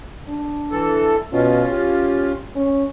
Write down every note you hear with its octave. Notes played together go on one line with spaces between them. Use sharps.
D4
E3 A4
B2 C#4 F4
G4
C#4